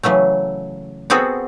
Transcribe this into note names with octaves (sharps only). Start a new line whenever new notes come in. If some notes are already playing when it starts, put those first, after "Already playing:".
C#3 E3 F#3 A3
B3 C4 F#4 G#4 A4